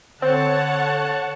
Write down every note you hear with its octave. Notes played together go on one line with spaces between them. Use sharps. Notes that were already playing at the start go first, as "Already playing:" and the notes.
D3 C4 C#5 F#5 A5